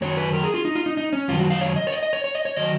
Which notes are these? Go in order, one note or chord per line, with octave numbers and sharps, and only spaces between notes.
F#2 D#3 F#3 C#5
B4
A#4
G#4
F4
D#4
F4
D#4
D#4
C#4
F#2 D#3 F#3 F4
F#4
F5
C#5
D#5
C#5
D#5
D#5
C#5
C#5
D#5
C#5
D#3 F#3 D#5